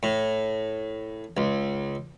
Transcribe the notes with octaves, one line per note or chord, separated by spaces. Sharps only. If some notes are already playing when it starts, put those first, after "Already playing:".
A2
C#2